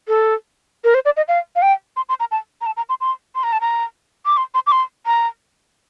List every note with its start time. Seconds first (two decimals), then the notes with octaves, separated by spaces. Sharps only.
0.08 A4
0.84 A#4
0.94 C5
1.05 D5
1.17 D#5
1.28 F5
1.56 F5
1.62 G5
1.96 C6
2.09 C6
2.20 A#5
2.31 A5
2.61 A#5
2.66 A5
2.77 A#5
2.89 C6
3.01 C6
3.35 C6
3.43 A#5
3.53 A5
3.61 A#5
4.26 D6
4.37 C6
4.54 C6
4.67 D6
4.72 C6
5.06 A#5